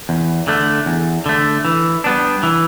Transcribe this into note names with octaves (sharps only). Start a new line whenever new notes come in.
E2
D3 A3
E2
D3 A3
E3
G3 B3 D4
E3